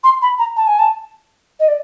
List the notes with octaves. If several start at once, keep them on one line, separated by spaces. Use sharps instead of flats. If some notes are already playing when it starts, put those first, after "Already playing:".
C6
B5
A#5
A5
G#5
A5
D#5
D5